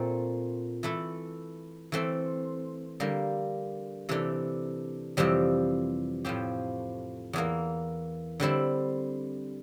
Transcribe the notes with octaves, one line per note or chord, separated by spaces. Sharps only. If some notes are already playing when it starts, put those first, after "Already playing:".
Already playing: A#2 A3 C4
E3 A3 E4
E3 A3 C4
D3 G3 A#3
C3 E3 A3 D4
F2 C3 E3 G3 C4
A2 F3 C4 G4
E2 E3 A#3
D3 G3 C4 E4